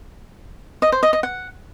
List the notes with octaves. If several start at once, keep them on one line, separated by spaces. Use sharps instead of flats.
D#5
C5
D#5
D#5
F#5